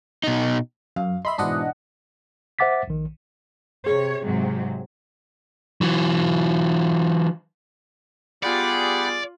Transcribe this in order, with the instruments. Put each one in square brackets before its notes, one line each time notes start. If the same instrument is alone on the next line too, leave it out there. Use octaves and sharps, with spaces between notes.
[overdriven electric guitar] B2 D#4
[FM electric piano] F#2 [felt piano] F5
[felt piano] D#5 [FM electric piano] E5 B5 C6
[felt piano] G#2 B2 E3 [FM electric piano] D4 D#5 F#5
[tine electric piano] C5 E5 F#5 D6 A6 B6
A#1 D#3
[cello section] C3 C#5 [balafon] G#4
[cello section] G#2 C3 F#3
[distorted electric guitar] E3 F#3
[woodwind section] G3 B3 G#4 [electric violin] F4 [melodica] G4 F#5 B5 [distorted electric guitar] D5